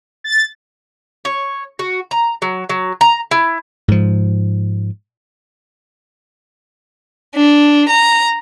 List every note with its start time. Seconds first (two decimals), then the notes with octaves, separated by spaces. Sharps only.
0.24 A6
1.25 C#5
1.79 F#4
2.11 A#5
2.42 F#3
2.69 F#3
3.01 A#5
3.31 E4
3.88 G#2 F3
7.35 D4
7.89 A#5